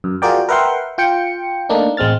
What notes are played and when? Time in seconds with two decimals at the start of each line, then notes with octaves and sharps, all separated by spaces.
0.04 F#2
0.22 F4 F#4 G#4 A#4 D5 G5
0.49 A#4 B4 E5 F#5 G5 C6
0.98 F4 G5 C#7
1.69 A3 A#3 D4 D#4
1.97 A1 G#3 C4 F6 A6